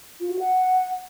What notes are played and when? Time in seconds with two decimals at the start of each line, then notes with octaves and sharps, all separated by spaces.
0.20 F4
0.30 F#4
0.39 F#5